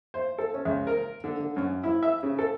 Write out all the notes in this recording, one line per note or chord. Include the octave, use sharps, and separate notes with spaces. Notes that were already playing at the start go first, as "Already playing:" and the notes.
C5
A4
C#4
C#2
A#4
D3
D3
F#2
E4
E5
C#3
A4